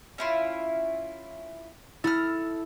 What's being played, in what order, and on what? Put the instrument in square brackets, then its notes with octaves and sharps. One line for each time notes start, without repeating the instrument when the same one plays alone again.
[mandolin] C#4 E4 F4
[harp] E4 [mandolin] A4 D#6 F6